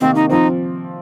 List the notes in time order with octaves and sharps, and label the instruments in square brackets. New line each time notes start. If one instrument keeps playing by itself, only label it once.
[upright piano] C3 D#3 A#3 [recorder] C4
[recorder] D#4
[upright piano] F3 C4 [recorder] D#4